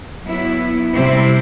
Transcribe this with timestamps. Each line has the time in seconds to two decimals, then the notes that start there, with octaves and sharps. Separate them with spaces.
0.24 F#3 B3 E4
0.93 C3 G3 C4 E4